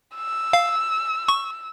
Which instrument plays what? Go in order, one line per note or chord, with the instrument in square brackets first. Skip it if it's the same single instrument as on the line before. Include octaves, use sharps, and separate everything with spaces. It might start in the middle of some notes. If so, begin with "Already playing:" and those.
[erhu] E6
[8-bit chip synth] F5
C#6